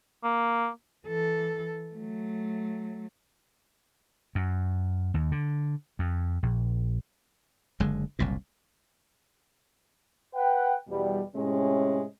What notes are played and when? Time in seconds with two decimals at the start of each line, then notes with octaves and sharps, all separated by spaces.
0.24 A#3
1.07 E3 A4
1.95 F#3 A3
4.35 F#2
5.14 D#2
5.32 D3
5.99 F2
6.43 A#1
7.80 F#1 D3 G#3
8.19 F#1 C2 A#2
10.35 B4 F#5 G5
10.88 E2 B2 G3
11.35 A2 C3 G#3 C#4